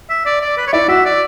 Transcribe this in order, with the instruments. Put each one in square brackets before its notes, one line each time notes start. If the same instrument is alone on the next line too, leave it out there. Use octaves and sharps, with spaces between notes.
[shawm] E5
D5
D5
B4
C#5
[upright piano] E4 [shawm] D5
[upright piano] F#4 [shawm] E5
[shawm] D5